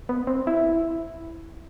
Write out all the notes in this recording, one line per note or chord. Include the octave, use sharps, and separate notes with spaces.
B3
C4
E4